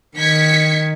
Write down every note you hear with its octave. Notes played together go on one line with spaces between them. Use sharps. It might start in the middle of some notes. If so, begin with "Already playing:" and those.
D#3 G#6 B6 C#7